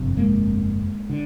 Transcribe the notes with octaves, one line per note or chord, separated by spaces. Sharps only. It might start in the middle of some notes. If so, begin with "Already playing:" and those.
Already playing: G1 F2 C3
G#3 A#3
D3